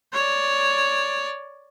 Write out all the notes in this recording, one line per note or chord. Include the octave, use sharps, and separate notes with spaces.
C#5 D5